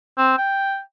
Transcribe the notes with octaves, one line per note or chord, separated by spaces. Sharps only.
C4
G5